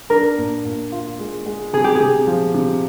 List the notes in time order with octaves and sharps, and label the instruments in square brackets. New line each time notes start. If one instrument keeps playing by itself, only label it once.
[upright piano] D4 [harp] A#4
[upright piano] A#2
A#2
F4
G#3
G#3
[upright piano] C3 [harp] G#4
[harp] G4
G#4
[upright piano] C3
F3
C3